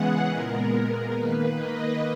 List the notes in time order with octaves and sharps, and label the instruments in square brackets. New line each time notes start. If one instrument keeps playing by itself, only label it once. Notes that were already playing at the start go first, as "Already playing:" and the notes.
Already playing: [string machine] C#3 E3 G#3 B3 G#4 F#5
A#2 G#3 B3 A#4
D#3 A#3 B4
D#5